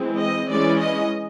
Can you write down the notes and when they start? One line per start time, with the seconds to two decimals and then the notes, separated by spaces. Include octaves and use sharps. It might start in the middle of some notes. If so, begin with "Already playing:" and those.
Already playing: E3 G#3 C4
0.20 D#5
0.50 E3 G#3 C#4 D5
0.80 D#5